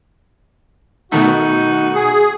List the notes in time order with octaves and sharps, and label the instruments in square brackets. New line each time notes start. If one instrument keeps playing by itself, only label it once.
[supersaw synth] B2 D#3 A3 [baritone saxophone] D#4 [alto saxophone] F#4
[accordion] G#4